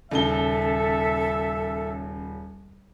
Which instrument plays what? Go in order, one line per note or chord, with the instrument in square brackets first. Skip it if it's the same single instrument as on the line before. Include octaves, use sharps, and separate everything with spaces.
[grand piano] D#1 C#3 G7 [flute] A4 [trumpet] E5